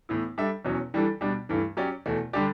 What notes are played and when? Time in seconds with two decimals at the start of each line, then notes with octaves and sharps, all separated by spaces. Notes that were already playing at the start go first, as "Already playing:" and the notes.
0.09 A2 E3 B3 E4
0.38 G3 D4 A4 E5
0.65 E2 B2 F#3 C#4
0.94 E3 G3 D4 A4
1.21 B2 G3 D4
1.49 G2 E3 A3
1.77 F#3 C#4 G4 D5
2.06 E2 B2 A3
2.33 D3 G3 D4 G4 D5